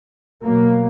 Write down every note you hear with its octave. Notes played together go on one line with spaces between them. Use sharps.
B2 F#3 A#3